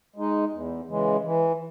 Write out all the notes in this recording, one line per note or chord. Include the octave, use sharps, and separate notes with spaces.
G#3 D#4
E2
C#3 E3 G#3
E3